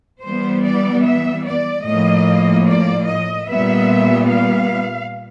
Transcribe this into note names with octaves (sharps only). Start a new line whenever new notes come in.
E3 G3 B3 C5
D5
E5
D5
A2 F3 A#3 D#5
D5
D#5
A#2 G3 B3 E5
F5